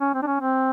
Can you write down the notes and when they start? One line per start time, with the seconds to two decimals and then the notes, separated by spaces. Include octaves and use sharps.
0.01 C#4
0.14 C4
0.22 D4
0.27 C#4
0.40 C4